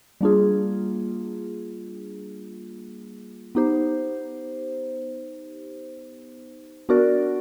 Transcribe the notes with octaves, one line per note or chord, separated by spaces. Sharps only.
G3 A#3 D4 F4 G#4
B3 D#4 G4 C5
B3 D4 F#4 A#4 D5